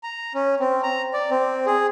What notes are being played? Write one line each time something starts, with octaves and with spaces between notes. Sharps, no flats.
A#5
C#4
C4
A#5
D5
C4
G#4